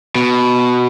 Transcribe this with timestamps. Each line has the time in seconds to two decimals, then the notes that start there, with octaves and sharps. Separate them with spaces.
0.15 B2